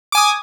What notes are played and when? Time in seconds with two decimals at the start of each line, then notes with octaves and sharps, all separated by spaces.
0.12 D6
0.15 G#5
0.17 D#6